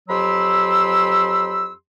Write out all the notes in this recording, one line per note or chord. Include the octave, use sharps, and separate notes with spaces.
F2 F#3 G4 B5 C6 E6